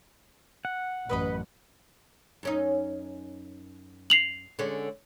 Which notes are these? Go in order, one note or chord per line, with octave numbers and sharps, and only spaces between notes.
F#5
A1 F#2 B4 D#5 B5
F#2 C#4 D#4
C7 F7 F#7
D3 G#3 C#4